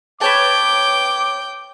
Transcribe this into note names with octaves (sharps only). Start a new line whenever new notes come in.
B4 C#5 G5 A5 D6